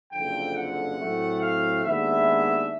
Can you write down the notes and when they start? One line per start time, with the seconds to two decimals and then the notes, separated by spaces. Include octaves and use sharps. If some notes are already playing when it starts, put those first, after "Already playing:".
0.12 F#1 F2 D3 F3 G5
0.55 F#5
0.98 A2 F#3 A3 C4
1.41 F5
1.84 D#2 D#3 G#3 B3 D4 E5